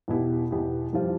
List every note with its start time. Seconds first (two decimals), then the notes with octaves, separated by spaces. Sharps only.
0.08 E2 B2 B3 E4 G4
0.51 E2 B2 B3 E4 G4
0.93 F2 E3 G3 C4 F4